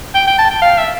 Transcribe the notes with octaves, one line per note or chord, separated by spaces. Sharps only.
G5
G5
A5
G5
F5
E5